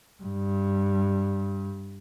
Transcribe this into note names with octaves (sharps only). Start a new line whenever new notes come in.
G2